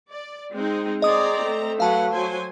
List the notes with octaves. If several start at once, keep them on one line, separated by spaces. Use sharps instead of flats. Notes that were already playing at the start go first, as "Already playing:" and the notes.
D5
G#3 C4 D#4
C4 G#4 D5 D#5 A#5 D#6
A3
F#3 B4 F5 F#5 A5
F#3 C5 G#5